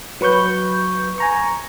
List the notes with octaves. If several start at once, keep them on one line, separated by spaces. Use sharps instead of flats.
F#3 B4 C#6 G6
G#5 A#5 C#6